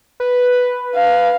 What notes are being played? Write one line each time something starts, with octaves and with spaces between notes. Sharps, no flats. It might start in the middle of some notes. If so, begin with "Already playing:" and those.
B4
F5